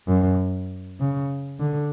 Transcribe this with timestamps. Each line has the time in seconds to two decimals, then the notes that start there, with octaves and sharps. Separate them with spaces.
0.08 F#2
1.00 C#3
1.60 D3